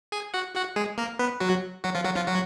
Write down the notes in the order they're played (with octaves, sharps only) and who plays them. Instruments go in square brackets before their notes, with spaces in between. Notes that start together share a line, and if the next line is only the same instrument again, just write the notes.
[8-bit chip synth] G#4 G#5
F#4 F#5
F#4 F#5
G#3 G#4
A#3 A#4
B3 B4
F#3 F#4
F#3 F#4
F3 F4
F#3 F#4
F3 F4
F#3 F#4